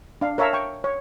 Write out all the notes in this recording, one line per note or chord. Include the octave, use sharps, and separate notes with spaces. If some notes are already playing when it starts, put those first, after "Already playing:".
D4 F5
A#4 C#5 E5 F5 A5 A#5
G5 C#6
C#5